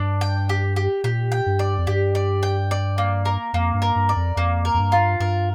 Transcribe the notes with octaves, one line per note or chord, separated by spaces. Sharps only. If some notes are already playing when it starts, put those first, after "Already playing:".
Already playing: G2 D4 D5
G5
G4
G4
A#2 G4
G5
G2
D5
F2
G2 G4
D5
G5
D5
A#3
A#4
F2 A#3
G2
A#4
G2
D5
F2
F2 A#3
A#4
F2
G2
F4
G2 A#4